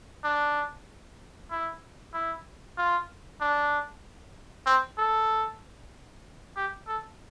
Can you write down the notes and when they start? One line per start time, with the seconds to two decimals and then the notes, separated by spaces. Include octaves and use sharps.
0.24 D4
1.51 E4
2.14 E4
2.77 F4
3.41 D4
4.66 C4
4.98 A4
6.57 G4
6.88 A4